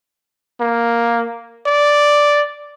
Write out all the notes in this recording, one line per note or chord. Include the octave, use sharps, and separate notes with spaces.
A#3
D5